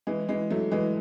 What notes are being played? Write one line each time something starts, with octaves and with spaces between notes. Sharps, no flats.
E3 G#3
E3 G#3
F#3 A3
E3 G#3